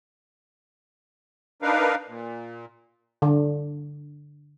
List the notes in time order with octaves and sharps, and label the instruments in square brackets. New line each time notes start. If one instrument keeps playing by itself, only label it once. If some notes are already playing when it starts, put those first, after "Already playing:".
[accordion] D4 D#4 A#4 B4 F5
A#2
[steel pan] D3